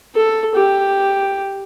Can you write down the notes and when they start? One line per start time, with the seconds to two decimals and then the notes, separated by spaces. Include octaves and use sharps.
0.15 A4
0.55 G4